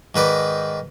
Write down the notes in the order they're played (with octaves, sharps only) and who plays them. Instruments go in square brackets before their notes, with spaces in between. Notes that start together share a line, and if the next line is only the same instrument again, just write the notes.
[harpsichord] G#2 D#3 B4 D5